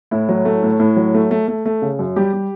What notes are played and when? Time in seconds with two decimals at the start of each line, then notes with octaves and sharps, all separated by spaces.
0.11 A2 E4
0.29 F#3
0.45 A3
0.63 A2
0.80 A2
0.96 F#3
1.14 A3
1.31 A3
1.48 A3
1.65 A3
1.82 C#3
1.99 F#2
2.16 G3 G4
2.33 G3